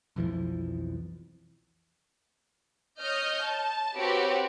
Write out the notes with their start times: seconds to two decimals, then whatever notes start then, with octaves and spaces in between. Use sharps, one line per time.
0.16 B1 F2 E3 F3
3.00 C#5 D#5 F6 G6
3.44 A5
3.97 C4 F#4 G4 B4 C#5